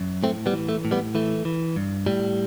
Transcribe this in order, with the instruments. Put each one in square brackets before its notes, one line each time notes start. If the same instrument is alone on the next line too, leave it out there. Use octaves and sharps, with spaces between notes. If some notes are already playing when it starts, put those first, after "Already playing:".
Already playing: [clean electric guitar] F#2
A2 A3 C4
G3 B3
E3
A3
A2
G3 B3
E3 A3
E3
G2
A2 G3